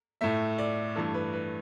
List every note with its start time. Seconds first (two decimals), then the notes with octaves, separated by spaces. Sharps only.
0.21 A2 A3 E5
0.58 D5
0.95 G2 E3 A3 A4
1.14 B4
1.33 B4